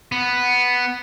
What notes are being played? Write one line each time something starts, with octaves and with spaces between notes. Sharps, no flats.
B3